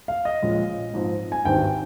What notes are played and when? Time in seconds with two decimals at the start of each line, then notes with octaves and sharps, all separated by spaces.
0.08 F5
0.25 D#5
0.42 A#1 A#2 G#3 C#4
0.94 G#2 F3 C4
1.32 G#5
1.45 G#1 G2 D#3 G3 C4 G5